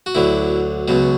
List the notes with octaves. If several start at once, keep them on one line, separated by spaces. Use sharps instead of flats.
F#4
D2 D3 F#3 E4
C#2 B2 F#3